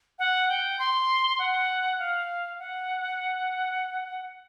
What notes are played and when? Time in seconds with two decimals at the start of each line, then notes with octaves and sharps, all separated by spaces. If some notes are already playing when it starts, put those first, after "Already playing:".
0.19 F#5
0.49 G5
0.79 C6
1.39 F#5
1.99 F5
2.59 F#5